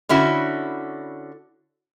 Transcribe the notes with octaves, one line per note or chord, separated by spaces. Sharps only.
D3 C#4 E4 F#4